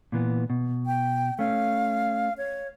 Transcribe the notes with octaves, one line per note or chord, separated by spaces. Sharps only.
A#2 E3 B3
B2
G5
A3 C#4 F5
C#5